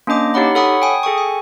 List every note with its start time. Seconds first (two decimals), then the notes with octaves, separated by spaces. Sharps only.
0.07 A#3 C#4 D4 D#5 D6
0.34 D#4 G4 C#5 F#5 B5
0.55 A4 C#5 F#5 B5 C#6 D#6
0.82 G5 G#5 D#6
1.03 G#4 A4 G5 C#6
1.18 G#5